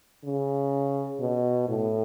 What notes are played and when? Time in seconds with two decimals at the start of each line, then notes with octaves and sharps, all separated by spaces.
0.24 C#3
1.20 B2
1.68 A2